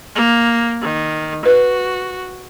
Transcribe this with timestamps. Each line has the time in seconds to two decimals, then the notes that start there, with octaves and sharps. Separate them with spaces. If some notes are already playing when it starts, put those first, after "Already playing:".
0.16 A#3
0.82 D#3
1.46 F#4 B4